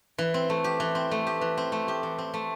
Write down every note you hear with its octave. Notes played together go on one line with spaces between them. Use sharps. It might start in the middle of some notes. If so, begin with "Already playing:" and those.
E3
C4
A3
G4
E3
C4
A3
G4
E3
C4
A3
G4
E3
C4
A3